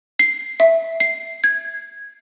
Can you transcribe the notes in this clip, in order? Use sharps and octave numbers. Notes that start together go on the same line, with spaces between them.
C7
E5
C7
G#6